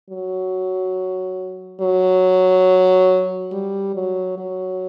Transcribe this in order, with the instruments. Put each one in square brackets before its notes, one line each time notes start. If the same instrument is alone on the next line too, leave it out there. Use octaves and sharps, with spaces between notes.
[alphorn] F#3
F#3
G3
F#3
F#3